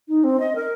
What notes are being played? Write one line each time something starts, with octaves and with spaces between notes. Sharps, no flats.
D#4
C4
D#5
A#4